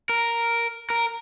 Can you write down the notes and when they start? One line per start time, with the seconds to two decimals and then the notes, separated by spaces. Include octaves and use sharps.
0.09 A#4
0.90 A#4